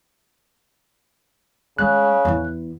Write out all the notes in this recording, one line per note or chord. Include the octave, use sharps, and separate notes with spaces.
C#3 G#3 A3 F#6
E2 E4